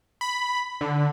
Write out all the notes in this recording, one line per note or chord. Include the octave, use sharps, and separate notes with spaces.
B5
D3